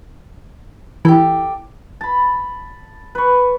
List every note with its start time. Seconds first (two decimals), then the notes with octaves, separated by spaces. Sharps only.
1.05 E3 G4 A4
2.01 A5 B5
3.15 B4 C#6